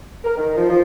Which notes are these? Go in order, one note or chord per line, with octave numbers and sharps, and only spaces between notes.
A#4
D#3
F3
F3